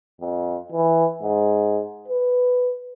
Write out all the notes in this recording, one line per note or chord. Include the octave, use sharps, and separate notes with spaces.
F2
E3
G#2
B4